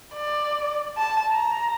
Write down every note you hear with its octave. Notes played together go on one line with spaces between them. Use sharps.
D5
A5
A#5